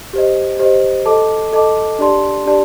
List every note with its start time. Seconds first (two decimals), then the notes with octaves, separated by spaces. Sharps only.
0.13 G4 C5 D#5
0.59 G4 C5 D#5
1.05 A4 D#5 A5 D6
1.53 A4 D#5 A5 D6
1.98 D4 G4 D5 A5 C6
2.46 D4 G4 D5 A5